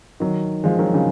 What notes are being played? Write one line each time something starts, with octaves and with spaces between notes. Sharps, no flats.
D#3 F#3
F3 G#3
D#3 F#3
C#3 F3